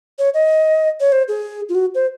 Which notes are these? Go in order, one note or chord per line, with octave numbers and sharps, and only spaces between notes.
C#5
D#5
C#5
C5
G#4
F4
F#4
C5